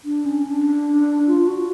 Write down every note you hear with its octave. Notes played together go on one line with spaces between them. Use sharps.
D4
C#4
D4
F4
F#4